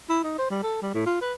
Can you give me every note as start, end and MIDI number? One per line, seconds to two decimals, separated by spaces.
0.10 0.21 64
0.24 0.35 63
0.38 0.46 72
0.50 0.61 55
0.63 0.79 69
0.82 0.91 55
0.94 1.06 45
1.06 1.21 65
1.21 1.34 71